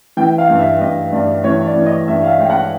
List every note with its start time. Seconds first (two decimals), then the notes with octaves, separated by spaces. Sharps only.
0.17 E3 G5
0.38 F5
0.49 G2
0.59 E5
0.81 G2 D#5
1.12 G2 D5
1.44 E3 C#5
1.65 D5
1.76 E3
1.86 D#5
2.08 G2 E5
2.23 F5
2.28 E5
2.39 G#3 G5
2.50 F#5